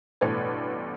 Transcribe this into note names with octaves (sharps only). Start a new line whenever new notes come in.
A1 G2 B2 A3 B4 G#6